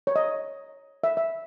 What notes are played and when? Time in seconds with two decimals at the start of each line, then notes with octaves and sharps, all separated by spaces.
0.07 C#5
0.16 D#5
1.04 E5
1.17 E5